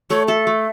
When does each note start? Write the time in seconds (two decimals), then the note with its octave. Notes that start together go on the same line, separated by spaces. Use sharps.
0.10 A3 C#5
0.28 A4 E5
0.47 A3